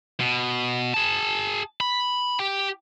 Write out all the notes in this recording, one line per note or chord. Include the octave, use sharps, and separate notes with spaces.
B2
G#4 A5
B5
G4 G5